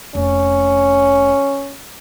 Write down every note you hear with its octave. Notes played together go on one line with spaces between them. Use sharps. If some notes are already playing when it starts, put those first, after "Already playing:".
F1 C#4